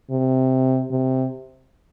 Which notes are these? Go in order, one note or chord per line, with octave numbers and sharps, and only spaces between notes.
C3
C3